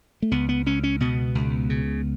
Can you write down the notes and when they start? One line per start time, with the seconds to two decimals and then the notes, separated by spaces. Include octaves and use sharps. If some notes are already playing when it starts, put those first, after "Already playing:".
0.22 A3
0.32 C#2 B3
0.49 B3
0.66 C#2 C#4
0.83 C#4
1.00 B2 B3
1.35 C#2
1.70 C#3